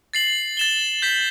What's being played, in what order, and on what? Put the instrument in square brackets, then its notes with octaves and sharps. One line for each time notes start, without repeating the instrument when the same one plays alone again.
[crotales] A6 C7 F#7
A6 E7 G7
G6 B6 F#7